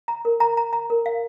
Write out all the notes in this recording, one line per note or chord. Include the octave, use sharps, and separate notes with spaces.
A#5
A#4
A#5
A#5
A#5
A#4
F5